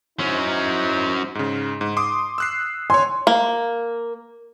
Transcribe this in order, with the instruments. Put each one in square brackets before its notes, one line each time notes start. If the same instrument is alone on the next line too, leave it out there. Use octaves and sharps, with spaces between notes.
[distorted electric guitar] F#3 C#4 [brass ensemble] D#4 E4 C5
[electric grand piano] G#2 C#3
G#2
C6 D6 D#6
E6 F#6 C7
[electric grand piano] C#5 G#5 [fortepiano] C6
[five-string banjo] A#3